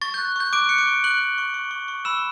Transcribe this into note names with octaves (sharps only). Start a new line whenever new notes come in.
C#6 A6
F#6 G6
C#6 G6
D6 F#6 D7
F#6 C#7
D6 D7
C#6
C#6 F#6 F#7
F#6
C#6
C#6
C#6
C#6
B5 E6 E7